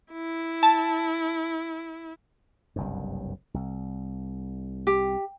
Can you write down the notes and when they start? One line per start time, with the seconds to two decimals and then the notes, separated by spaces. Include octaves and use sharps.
0.12 E4
0.63 A5
2.76 F#1 C2 G2
3.54 C2
4.87 G4